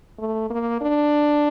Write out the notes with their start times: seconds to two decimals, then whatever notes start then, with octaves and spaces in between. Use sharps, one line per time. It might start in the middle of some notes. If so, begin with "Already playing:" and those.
0.19 A3
0.50 A#3
0.81 D4